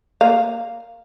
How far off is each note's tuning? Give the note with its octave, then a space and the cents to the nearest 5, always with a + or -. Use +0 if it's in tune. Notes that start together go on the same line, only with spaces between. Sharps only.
A#3 -10 F5 +0